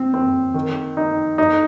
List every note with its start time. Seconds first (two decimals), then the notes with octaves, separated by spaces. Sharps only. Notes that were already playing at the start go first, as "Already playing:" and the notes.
Already playing: C4
0.14 C4
0.54 D#3
0.97 D#4
1.38 D#4